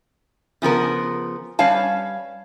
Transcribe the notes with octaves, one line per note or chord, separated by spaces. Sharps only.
C#3 F3 B3 A#4
G3 C#4 B4 C#5 F5 A5